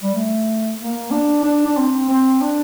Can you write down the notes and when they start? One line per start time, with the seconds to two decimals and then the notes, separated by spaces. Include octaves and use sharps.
0.03 G3
0.14 A3
0.79 A#3
1.11 D4
1.43 D4
1.67 D4
1.77 C4
2.09 C4
2.41 D4